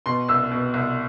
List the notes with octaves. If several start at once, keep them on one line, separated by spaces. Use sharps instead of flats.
B2 C6
C2 E6
B2
C2